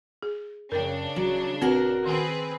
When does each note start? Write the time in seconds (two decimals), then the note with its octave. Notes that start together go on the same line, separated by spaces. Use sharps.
0.23 G#4
0.72 F#2 C#3 D4 A#4 G5
1.16 D1 F#3
1.61 D#1 C4 F#4 A#4 B4
2.06 D#3 C4 G#4 B4